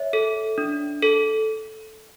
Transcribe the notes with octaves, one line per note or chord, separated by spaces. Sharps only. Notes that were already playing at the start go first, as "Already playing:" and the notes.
Already playing: C#5 E5
A4
D4
A4